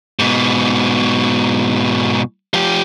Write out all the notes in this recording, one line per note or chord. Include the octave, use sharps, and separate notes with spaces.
G#2 B2
F3 G4